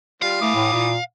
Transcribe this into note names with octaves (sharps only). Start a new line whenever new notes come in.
G3 F4 F5
E3 A3 D6 D#6
A2
A#2